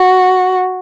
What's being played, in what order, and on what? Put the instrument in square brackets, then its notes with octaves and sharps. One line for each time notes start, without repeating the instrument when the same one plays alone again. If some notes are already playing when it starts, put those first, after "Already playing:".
Already playing: [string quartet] F#4